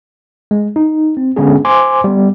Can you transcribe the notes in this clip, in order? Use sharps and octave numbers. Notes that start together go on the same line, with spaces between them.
G#3
D#4
C4
D3 G#3 B3 C#4 D4 G#4
C5 G#5 C6 D6
G3 B3